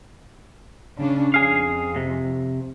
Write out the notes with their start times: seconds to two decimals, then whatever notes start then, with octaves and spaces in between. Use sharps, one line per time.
0.97 C#3 C#4 D4
1.34 F2 G#4 F5
1.96 C3